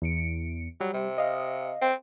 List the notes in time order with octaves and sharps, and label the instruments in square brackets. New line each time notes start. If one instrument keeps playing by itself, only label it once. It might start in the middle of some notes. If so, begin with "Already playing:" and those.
[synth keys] E2 C#7 D7
[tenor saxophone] F#3 [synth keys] G3
[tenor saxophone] C3
[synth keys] D#5 F5
[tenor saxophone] C4